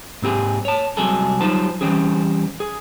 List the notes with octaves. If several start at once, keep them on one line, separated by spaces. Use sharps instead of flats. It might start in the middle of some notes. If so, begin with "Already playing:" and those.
G#2 C4 G4 G#4
C#5 A5
C2 C3 F#3 G#3 G#4 A4
F#3 G3 D#4 F4 C5 A5
E3 G3 C4 C#4 G#4
G#4